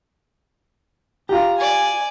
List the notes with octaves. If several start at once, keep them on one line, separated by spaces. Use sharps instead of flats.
F4 G4 A#5
D5 G#5